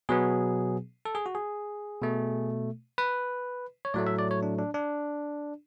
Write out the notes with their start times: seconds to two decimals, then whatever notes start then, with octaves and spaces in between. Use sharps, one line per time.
0.09 B2 F#3 B3 G#4
1.05 A4
1.15 G#4
1.26 F#4
1.35 G#4
2.01 B2 A3
2.98 B4
3.85 C#5
3.94 A2 F#3 A3 D5
4.07 E5
4.19 D5
4.31 C#5
4.43 D4
4.58 D4
4.74 D4